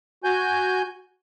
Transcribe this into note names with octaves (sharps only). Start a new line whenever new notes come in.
F#4 G#5 G6